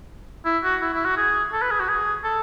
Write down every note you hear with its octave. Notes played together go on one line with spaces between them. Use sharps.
E4
F#4
E4
E4
F#4
G#4
A4
B4
G#4
F#4
G#4
A4